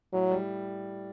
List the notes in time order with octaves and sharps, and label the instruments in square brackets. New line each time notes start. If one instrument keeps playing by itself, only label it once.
[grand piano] A2 [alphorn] F#3
[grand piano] G3